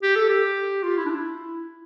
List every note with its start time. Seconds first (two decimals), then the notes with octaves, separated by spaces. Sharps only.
0.03 G4
0.16 A4
0.30 G4
0.83 F4
0.97 E4
1.05 D4
1.10 E4